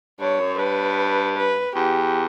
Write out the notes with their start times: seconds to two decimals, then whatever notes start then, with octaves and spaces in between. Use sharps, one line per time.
0.20 G2 C#5
0.40 F#2
0.59 G2 B4
1.37 B4
1.75 E2 G4